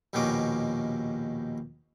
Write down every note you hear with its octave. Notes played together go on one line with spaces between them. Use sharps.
A#1 D#2 B2 D#3 C#4 D6